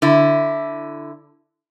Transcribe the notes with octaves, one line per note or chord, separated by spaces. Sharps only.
D3 E4